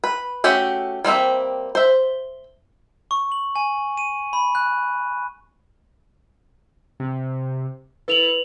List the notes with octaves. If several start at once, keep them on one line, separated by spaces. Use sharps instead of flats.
B4
A3 C#4 F#4 G4 E5
G3 A#3 C4 E5
C5 E5
C#6
F#7
G#5
D#7
B5
F#6
C3
E4 A4 B4 F7 F#7